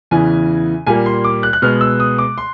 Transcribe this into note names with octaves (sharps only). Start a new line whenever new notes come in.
E2 C#3 E3 G#5
A#2 G3 A#3 G#5
C6
D6
F#6
F#6
B2 G#3 B3 F6
E6
D#6
D6
C6